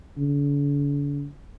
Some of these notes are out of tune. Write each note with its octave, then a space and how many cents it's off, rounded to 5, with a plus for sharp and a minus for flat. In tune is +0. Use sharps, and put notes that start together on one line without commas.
D3 -45